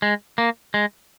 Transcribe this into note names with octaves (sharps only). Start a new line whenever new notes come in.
G#3
A#3
G#3